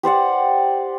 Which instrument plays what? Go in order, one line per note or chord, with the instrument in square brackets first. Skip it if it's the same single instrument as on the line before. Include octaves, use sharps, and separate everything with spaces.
[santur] G4 C5 D5 F#5